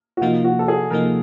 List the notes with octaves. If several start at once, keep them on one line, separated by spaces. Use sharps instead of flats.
F#4
C3 F3 A#3 D#4 F4
F#4
A4
G#4
C3 F3 A#3 D#4 A#4